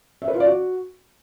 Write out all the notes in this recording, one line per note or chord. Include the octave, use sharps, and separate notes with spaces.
E5
B4
F4
D5
F#4